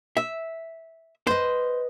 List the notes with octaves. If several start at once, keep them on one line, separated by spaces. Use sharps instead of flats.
E5
B4 C5 D#5